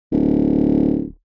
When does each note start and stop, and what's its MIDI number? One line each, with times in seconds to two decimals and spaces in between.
0.12 1.07 26